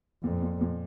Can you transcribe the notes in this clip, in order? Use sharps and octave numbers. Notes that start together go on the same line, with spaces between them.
F2 A#2
A#2
A#2